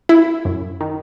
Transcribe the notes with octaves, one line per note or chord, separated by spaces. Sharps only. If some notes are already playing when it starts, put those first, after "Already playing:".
E4
F#2
D#3